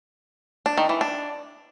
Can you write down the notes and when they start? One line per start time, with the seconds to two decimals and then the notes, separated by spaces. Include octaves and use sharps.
0.66 D4
0.78 D#3
0.89 E3
1.01 D4